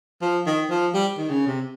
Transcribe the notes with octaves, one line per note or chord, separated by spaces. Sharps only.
F3
D#3
F3
G3
D#3
C#3
C3